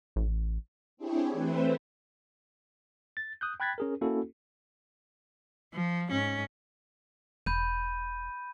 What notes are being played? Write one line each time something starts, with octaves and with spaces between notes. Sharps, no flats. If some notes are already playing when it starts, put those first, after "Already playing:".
A1
C4 D4 E4 G4 G#4 C#5
E3 A3 C4 B4 C5 E5
A6
D#6 F#6 G6
G5 B5 F#6 G#6 A6 B6
C#4 G#4 A#4
A#3 C#4 E4 F#4 A4
F3
G#2 C#4
E1 B5 G6 D#7